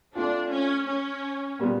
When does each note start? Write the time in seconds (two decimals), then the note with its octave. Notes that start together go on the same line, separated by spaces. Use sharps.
0.14 A3 C4 D4 F4
0.51 C#4
0.87 C#4
1.59 A#2 G3 B3